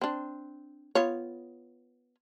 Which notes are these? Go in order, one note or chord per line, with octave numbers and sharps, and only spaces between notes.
C4 D4
B3 F4 C#5